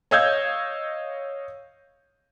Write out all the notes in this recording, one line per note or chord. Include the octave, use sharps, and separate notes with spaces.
C#5 D#5 F5 E6 G6 G#6